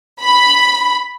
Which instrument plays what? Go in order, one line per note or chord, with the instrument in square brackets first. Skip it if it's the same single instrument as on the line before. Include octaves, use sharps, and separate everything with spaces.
[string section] B5